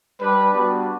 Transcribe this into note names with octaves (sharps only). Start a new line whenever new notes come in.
G3 D4 G4 B4
G3 B3 D4 F#4